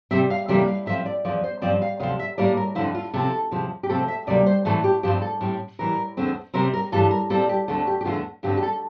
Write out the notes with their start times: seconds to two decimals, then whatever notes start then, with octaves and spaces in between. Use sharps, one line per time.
0.11 C3 G3 C4 E5
0.30 F5
0.48 F2 C3 E3 G3 A#3 E5
0.68 F5
0.86 A2 F3 C4 E5
1.06 D5
1.25 E2 C3 F3 D5
1.44 C5
1.62 G2 F3 C4 D5
1.82 F5
1.99 D2 C3 F3 F5
2.19 E5
2.38 A2 G3 A#3 D5
2.57 A#4
2.75 F2 D3 F3 E4
2.95 F4
3.14 C3 F3 C4 A4
3.51 E2 C3 F3
3.83 G4
3.89 C3 F3 A3 C4 A4
4.08 E5
4.27 D2 C3 G3 A#3 D5
4.46 C5
4.65 A2 E3 A3 C4 A4
4.84 G4
5.03 G2 F3 C4 G4
5.22 A4
5.41 A2 G3 C4
5.79 A2 E3 G3 A#4
6.17 E2 D3 A3 C4
6.54 C3 G3 C4 A#4
6.73 A#4
6.92 G2 E3 G3 A4
7.11 A#4
7.30 A#2 G3 C4 A4
7.49 G4
7.68 D2 D3 A3 C4 A4
7.87 G4
8.01 G4
8.05 E2 D3 A3 F4
8.43 G2 D3 A3 C4 G4
8.57 G4
8.63 A4